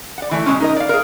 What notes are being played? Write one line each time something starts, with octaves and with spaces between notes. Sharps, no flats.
D5 F#5
E3 A3
B2 G#3 C4 C#4
D#4 A#4 D#5
D5 F5
G#4 A#4